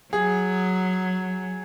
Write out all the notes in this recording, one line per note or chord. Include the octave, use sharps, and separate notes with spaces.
F#3 G#4